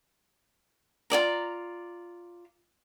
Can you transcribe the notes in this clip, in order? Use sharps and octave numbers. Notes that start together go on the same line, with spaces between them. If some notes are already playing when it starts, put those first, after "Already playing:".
F4 G#4 D5 A#5